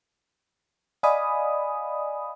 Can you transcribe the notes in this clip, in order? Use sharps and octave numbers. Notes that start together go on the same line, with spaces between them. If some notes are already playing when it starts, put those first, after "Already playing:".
D5 D#5 F5 G#5 B5 D#6